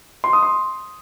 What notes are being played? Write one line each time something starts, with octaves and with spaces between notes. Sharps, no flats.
C6
D#6
C6